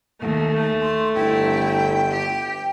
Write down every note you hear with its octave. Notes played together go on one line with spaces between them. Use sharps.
D#2 A3
C6
G1 E4 G5
G4